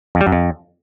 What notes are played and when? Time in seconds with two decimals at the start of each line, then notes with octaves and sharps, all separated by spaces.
0.15 F2
0.21 G3
0.27 F#2
0.32 F2